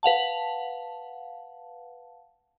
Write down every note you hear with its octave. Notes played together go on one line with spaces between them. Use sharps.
B4 F5 F#5 A5